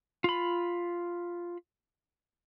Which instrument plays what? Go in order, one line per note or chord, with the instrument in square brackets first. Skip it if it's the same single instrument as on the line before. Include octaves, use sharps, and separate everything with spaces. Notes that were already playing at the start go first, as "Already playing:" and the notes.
[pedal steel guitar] F4 B5